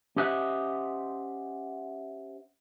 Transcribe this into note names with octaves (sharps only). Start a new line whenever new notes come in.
C#4 G4 C5 D#5 E5 F#5